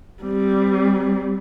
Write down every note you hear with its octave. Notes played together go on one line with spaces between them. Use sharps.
G3 C4